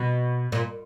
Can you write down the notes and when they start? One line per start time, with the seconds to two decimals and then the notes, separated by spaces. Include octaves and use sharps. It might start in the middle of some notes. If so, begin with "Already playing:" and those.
Already playing: B2
0.52 A#2